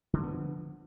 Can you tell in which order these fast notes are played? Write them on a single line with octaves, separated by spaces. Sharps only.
D3 G#3 B3 F3